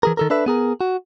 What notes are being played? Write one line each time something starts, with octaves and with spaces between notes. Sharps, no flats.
E3 G#4 A#4
D#3 A4 A#4
D4 A4 B4 E5
B3 G#4 A#4
F#4